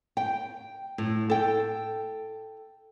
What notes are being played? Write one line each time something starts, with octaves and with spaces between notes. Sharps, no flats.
G5
A2
A4 G5